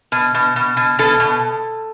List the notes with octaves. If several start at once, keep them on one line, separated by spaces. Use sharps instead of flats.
B2
B2
B2
B2
B2 A4
B2